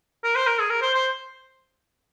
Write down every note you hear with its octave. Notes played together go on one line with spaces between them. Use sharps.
A#4
C5
A#4
G#4
A#4
C5
C5